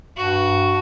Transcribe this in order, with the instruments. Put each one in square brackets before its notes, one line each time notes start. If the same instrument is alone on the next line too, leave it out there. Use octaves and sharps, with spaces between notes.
[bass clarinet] G2 [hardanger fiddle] F#4